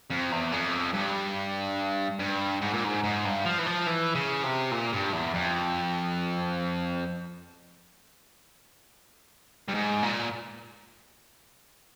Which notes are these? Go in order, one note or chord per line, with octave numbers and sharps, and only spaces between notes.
F2
E2
F2
G2
G2
G#2
A#2
G#2
G#2
G2
F3
E3
F3
E3
C#3
C3
A#2
G2
E2
F2
G2
G#2
A#2